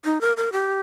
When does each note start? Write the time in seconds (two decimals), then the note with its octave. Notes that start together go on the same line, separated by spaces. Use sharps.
0.05 D#4
0.21 A#4
0.37 A#4
0.52 G4